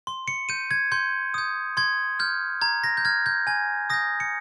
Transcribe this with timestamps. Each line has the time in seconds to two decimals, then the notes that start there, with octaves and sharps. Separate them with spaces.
0.07 C6
0.28 C#7
0.49 G6 D#7
0.71 G#6
0.92 C6 G6
1.34 D#6 G6
1.77 C6 G#6
2.19 F6 G6
2.61 A#5 G#6
2.84 A#6
2.97 G6
3.05 F6 G#6
3.26 G6
3.47 G#5 G#6
3.90 D#6 G6 A#6
4.20 C#7